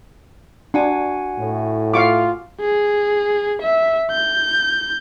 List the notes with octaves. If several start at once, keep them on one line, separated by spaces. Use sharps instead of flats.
D4 F#4 F#5 G#5
A2
F4 F5 C#6 D6
G#4
E5
G6